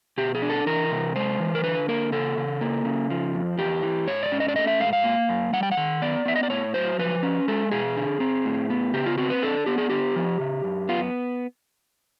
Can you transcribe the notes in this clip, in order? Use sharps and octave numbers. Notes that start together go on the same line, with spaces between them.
B2 G4
G#4
D4
A4
E3 A#4
C3
G#3 C5
E3
A#4
D3 B4
A#3 A#4
C#3 A4
C#3
A#3
C#3
F3
F2
E2 G4
E3
G#2 C#5
D5
C#4
D#5
D5
A3 D#5
E5
G#2 F5
F5
A#3
F#2
G3 F#5
G5
F#5
D#3
B3 D5
B3 E5
D#5
D5
A2 C#5
F#3 C5
F3 B4
C#4
G#3 A4
B2 G#4
D3
C4
A2
B3
C#3 G4
F4
C4 F#4
B4
D4 A4
B3 G4
G#4
D3 G4
F3
C#3
F#2
B3 F4